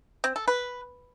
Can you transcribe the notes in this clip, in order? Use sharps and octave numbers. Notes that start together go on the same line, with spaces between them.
C4
A4
B4